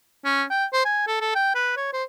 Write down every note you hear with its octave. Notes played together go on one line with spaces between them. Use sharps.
C#4
G5
C5
G#5
A4
A4
G5
B4
C#5
C5